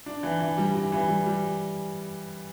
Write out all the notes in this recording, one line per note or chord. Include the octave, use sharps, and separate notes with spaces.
D4
E3
E3
G3
E3
E3
G3
G3